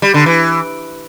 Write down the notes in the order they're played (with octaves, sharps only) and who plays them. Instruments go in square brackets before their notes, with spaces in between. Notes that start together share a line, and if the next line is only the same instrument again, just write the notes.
[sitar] G3
D3
E3